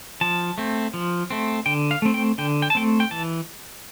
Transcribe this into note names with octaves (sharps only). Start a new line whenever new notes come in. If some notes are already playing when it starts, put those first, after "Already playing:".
F3 A5
A3 C4
F3
A3 C4
D3 G5
F5
A3 C4
G5
D3 G5
G5
A5
A3 C4 G5
G5
E3 A5